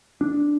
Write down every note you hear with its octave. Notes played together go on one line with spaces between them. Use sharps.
D4